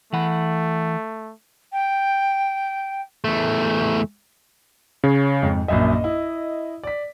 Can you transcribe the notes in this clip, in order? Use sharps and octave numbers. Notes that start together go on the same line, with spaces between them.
E3 A3 F#5 B5
G5
E2 A3
C#3 C#5
F2 G#2
A#1 F#2 D#5 E5
E4
D5 B6